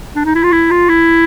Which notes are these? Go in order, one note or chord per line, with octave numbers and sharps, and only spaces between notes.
D4
D#4
E4
F4
E4
F4
E4